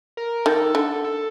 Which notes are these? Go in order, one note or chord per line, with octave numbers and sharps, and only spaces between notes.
A#4
D#3 A4
D3
A4